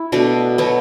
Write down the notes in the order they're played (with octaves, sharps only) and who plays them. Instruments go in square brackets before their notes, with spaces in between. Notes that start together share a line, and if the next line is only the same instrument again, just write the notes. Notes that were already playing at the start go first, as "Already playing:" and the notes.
Already playing: [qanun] E4
B2 A3 D4
B2 F#3 B3